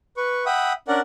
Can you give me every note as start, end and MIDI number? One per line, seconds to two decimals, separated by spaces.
0.17 0.45 71
0.17 0.45 85
0.46 0.73 76
0.46 0.73 78
0.46 0.73 79
0.46 0.73 83
0.46 0.73 87
0.88 1.00 61
0.88 1.00 62
0.88 1.00 70
0.88 1.00 74
0.88 1.00 78